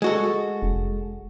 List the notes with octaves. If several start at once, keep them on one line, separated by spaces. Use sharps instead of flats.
G#3 F#4 A4
F1